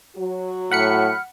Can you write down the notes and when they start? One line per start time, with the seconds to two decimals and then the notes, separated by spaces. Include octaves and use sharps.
0.16 F#3 F#4
0.71 A2 F#5 B5 F6 C#7